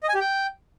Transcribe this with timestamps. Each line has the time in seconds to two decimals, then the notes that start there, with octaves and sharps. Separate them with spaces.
0.03 D#5
0.09 G#5
0.15 G4
0.20 G5